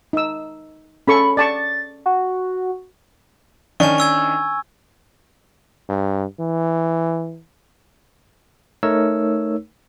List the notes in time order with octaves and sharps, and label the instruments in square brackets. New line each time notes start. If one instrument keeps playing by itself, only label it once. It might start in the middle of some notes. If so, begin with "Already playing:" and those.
[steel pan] D#4 E6
[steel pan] C#4 A4 C#6 [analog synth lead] B5
[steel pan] D5 A5 C#6 [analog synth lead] A6
[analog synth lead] F#4
[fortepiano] D#3 C#4 D4 [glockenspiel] G#5 C#6
[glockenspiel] C#6 E6 G#6
[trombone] G2
E3
[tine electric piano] A3 D#4 A#4 C#5 E6